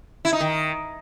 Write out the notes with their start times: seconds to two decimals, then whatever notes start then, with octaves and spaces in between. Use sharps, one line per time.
0.25 E4
0.33 D#4
0.40 D#3